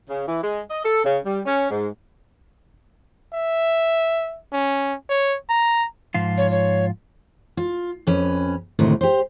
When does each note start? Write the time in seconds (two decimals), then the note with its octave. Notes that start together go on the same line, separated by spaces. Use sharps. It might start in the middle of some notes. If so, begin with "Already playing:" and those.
0.09 C#3
0.28 E3
0.43 G#3
0.70 D#5
0.85 A4
1.04 C#3
1.25 G3
1.46 C#4
1.70 G#2
3.33 E5
4.52 C#4
5.09 C#5
5.49 A#5
6.14 G#2 F3 F4
6.38 C#5
6.51 C#5
7.57 F4
8.07 F2 C#4 B4
8.79 D2 A2 C3 D#3
9.01 G4 C5